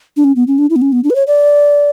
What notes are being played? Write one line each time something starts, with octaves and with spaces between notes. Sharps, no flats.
D4
C#4
B3
C#4
D4
E4
B3
C#4
B3
D4
B4
C#5
D5